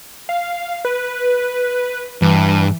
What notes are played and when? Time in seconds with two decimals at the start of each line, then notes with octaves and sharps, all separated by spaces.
0.29 F5
0.85 B4
2.22 G2 E3